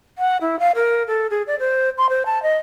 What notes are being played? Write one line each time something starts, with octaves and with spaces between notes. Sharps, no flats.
F#5
E4
F5
A#4
A4
G#4
D5
C5
C6
C5
A5
D#5